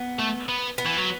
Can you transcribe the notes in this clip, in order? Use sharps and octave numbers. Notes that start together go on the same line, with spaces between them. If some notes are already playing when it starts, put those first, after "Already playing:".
Already playing: B3
A3
B3
B3
E3
F#3